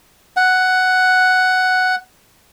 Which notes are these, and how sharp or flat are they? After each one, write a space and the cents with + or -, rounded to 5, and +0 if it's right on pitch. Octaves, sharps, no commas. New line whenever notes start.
F#5 +5